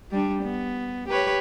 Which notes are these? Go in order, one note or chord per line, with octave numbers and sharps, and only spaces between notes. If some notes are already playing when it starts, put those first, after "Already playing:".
G3 D4
B3
G4 B4 C#5